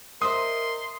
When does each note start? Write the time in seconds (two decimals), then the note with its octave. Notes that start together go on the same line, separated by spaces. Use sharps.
0.22 A#4 C5 D#5 E5 C6 D#6